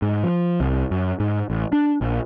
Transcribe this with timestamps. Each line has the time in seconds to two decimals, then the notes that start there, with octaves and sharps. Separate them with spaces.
0.02 G#2
0.23 F3
0.60 C2
0.91 F#2
1.20 G#2
1.50 A1
1.73 D4
2.01 A#1